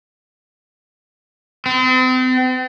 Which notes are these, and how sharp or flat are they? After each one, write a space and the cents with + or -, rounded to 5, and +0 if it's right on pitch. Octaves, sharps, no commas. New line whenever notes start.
C4 -40